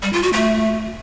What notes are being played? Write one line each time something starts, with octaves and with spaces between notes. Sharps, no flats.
G3
F4
F#4
A3